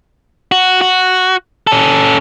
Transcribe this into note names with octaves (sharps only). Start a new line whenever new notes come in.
F#4
F#4
C#4 A4